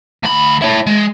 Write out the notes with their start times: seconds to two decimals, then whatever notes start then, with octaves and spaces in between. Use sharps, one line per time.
0.23 D2 B5
0.62 E4 C#5
0.87 G#3